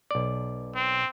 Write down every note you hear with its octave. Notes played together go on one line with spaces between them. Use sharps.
B1 D5
C4